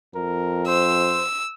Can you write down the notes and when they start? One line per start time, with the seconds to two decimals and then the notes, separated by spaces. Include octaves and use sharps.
0.15 F2 A#4
0.67 C5 E6